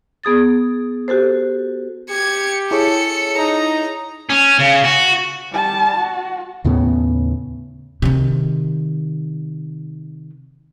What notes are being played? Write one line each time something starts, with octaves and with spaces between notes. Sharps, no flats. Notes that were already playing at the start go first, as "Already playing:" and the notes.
B3 G#4 D#6 A6
F#4 G4 A4 C5
G4 G#6 C#7
E4 G#4 A4 C#5 C#7
D#4 A#5
C#4
C#3
F#4
G3 A5
F#4
D#2 A2 C#3 B3
C3 D#3